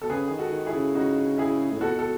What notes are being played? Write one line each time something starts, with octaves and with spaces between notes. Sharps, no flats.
B2 A4
C#3 G#4 B4
D#3 G#4
F#4 A4
D#3
E4 G#4
C#3
C#3 D#4 F#4
E4 G#4
A2
B2 F#4 A4
A4